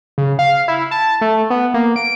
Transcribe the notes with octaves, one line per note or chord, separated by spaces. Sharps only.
C#3
F5
E4
A5
A3
B3
A#3
D7